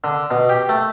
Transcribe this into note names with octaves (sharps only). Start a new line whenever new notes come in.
D3
B2
G4
A3